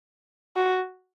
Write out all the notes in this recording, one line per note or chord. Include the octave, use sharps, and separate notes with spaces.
F#4